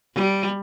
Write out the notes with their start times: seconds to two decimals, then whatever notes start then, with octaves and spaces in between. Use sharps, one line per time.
0.15 G3